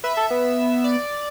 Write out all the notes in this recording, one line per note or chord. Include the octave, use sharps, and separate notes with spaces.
B4 E5
A4
B3
D5